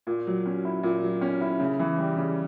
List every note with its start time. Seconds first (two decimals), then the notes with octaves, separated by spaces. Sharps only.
0.07 A#2
0.27 F#3
0.46 C#4
0.65 E4
0.83 A#2
1.03 F#3
1.21 C#4
1.41 E4
1.60 C#3
1.79 E3
1.98 G3
2.17 C#3